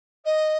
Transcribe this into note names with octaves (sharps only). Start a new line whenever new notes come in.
D#5